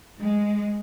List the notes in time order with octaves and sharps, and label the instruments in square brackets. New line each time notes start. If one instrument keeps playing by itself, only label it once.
[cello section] G#3